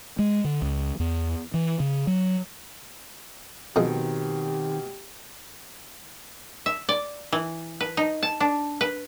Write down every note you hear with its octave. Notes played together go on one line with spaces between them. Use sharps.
G#3
D3
C#2
E2
E3
C#3
F#3
F2 B2 D#3 G#3 C4 G4
E5
D5
E3
B4
D#4
A5
D4
B4